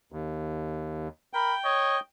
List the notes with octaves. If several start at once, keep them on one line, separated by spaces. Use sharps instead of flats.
D#2
A#4 G5 B5
C#5 D#5